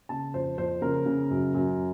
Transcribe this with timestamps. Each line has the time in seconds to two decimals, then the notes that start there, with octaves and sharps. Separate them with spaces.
0.09 C#3 A5
0.34 F2 C5
0.58 F2 C5
0.82 C#3 A#4
1.06 C#3
1.30 F#2
1.54 F#2